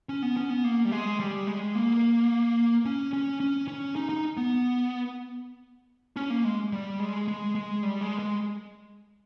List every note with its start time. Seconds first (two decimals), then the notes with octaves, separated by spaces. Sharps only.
0.09 C#4
0.22 B3
0.37 C#4
0.50 B3
0.64 A#3
0.85 G3
0.92 G#3
1.20 G3
1.47 G#3
1.75 A#3
2.85 C#4
3.13 C#4
3.40 C#4
3.68 C#4
3.96 D#4
4.09 D#4
4.37 B3
6.16 C#4
6.30 A#3
6.45 G#3
6.73 G3
6.99 G#3
7.28 G#3
7.55 G#3
7.83 G3
8.01 G#3
8.19 G#3